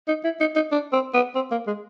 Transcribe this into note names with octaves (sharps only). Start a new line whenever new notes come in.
D#4
E4
D#4
D#4
D4
C4
B3
C4
A#3
G#3